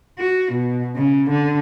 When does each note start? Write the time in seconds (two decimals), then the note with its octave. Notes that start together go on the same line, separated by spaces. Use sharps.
0.18 F#4
0.52 B2
0.96 C#3
1.29 D3